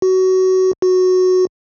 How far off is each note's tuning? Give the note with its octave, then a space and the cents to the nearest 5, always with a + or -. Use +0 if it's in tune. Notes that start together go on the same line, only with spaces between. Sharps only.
F#4 +20
F#4 -5